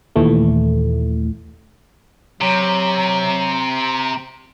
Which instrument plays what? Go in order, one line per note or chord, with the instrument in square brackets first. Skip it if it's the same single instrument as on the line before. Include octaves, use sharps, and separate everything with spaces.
[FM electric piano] D#2 A#2 E3 A3
[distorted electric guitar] C3 [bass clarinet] F#3 [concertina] A#5